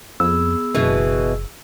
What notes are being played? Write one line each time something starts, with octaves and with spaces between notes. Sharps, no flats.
F2 B3 G#4 E6
F#1 B2 E3 G#4